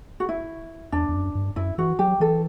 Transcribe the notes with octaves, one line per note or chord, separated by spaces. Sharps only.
F#4
E4
E2 D4
E2
F#2
G2
F#2 E4
E3 F#4
F#3 G4
E3 A4